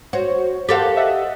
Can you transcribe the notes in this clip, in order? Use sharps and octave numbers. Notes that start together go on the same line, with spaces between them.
F#4 C5 C#5
G4 A4 A#4 C5 F5 F#5
D#5 E5 F#5